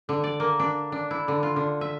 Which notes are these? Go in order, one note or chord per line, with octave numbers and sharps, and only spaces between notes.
D3
D5
A#3
D4
D4
E4
D3
F4
D3
E5